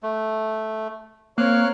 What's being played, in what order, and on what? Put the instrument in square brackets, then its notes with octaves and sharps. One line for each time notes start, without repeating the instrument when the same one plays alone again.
[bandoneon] A3
[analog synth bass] A#3 [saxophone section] C4 A#4 C#5 [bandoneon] F5 F6 F#6